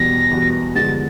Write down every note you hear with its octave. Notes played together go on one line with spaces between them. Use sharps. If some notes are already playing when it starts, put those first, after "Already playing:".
Already playing: E2 B2 G3 B3 A#6
E2 B2 G3 B3
G2 D3 F3 G#3 B3 A6